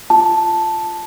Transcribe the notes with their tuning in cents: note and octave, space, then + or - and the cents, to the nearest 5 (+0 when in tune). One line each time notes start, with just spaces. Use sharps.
F4 +0 A5 +0